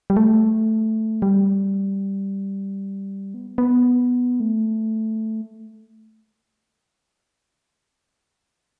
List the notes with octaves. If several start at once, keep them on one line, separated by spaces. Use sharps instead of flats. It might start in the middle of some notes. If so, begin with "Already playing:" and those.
G3
A3
G3
B3
B3
A3